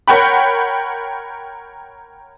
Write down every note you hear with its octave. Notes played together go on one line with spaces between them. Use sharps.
A#4 C#5 F#5 G5 B5